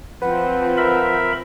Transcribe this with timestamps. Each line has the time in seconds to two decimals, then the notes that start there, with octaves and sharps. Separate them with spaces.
0.22 F3 C4 B4 F#5
0.77 A#4 E5 B5